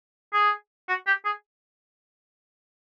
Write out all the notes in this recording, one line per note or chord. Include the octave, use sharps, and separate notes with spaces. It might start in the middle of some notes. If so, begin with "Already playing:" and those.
G#4
F#4
G4
G#4